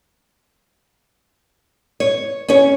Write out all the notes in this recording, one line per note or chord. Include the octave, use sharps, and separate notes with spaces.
C#5
C#4 C#5